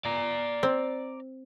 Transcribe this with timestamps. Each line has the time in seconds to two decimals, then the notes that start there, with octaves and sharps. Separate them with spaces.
0.05 D5 A#5
0.63 C4